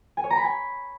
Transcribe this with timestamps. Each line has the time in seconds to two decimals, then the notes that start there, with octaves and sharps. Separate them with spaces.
0.17 G#5
0.24 C#5
0.30 A#5
0.37 B5
0.44 G#5